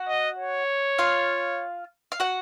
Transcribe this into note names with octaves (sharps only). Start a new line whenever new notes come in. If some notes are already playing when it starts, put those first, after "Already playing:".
Already playing: F#4 F#5
D#5
C#5
F4 F5
F5
F#4 F#5